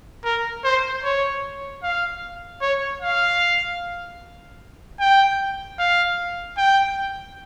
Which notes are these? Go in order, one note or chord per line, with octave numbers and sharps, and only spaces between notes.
A#4
C5
C#5
F5
C#5
F5
G5
F5
G5